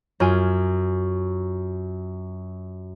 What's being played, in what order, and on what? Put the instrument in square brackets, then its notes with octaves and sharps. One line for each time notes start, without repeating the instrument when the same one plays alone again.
[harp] F#2 F4 G#5 D#7